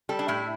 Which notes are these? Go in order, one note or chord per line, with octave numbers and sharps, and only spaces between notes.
G3 A4
D4
A2 E4